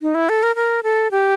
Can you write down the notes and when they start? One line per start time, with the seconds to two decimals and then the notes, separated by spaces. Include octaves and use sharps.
0.02 D#4
0.15 E4
0.29 A4
0.43 A#4
0.56 A#4
0.83 A4
1.11 G4